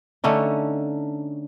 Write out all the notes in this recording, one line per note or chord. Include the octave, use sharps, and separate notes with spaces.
D3 A3 C#4 D#4